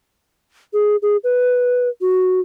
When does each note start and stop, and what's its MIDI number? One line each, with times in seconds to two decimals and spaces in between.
0.73 0.96 68
1.02 1.17 68
1.24 1.89 71
2.01 2.40 66